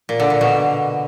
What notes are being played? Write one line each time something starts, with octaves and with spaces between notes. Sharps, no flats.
A#2
D3
A#2
B2